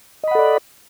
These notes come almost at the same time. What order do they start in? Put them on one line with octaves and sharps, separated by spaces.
D#5 B5 F#5 A4 D5